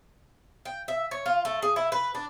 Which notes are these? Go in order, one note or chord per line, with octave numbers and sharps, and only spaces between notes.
G5
E5
C#5
F4
A3
G#4
E4
B4
D4